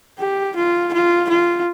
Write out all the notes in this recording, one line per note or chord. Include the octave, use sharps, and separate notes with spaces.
G4
F4
F4
F4